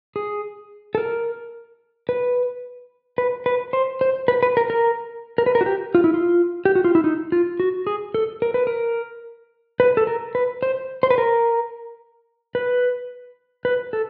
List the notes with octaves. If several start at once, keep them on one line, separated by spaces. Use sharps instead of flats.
G#4
A4
A#4
B4
B4
B4
C5
C5
B4
B4
A#4
A#4
A#4
B4
A#4
F#4
G4
F4
E4
F4
G4
F#4
F4
E4
D#4
F4
F#4
G#4
A4
A#4
B4
A#4
B4
A4
A#4
B4
C5
C5
B4
A#4
B4
B4
A4